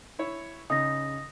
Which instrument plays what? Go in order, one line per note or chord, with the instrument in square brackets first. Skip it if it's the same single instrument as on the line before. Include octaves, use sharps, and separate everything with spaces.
[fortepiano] E4 C#5
[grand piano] C#3 [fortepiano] D#4 [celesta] D#6 A#6